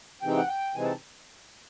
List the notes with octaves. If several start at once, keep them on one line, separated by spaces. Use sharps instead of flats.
C3 E3 G#3 C4 D#4 G5
F#5
G5
C3 E3 G#3 C4 D#4 G#5
A5